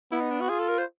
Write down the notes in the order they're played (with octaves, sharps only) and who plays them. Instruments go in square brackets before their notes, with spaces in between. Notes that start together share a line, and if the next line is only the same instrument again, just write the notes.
[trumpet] B3 [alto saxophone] E4
[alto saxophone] D#4
D4
F#4
[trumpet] F4 [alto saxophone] G#4
[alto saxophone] A4
A#4
C5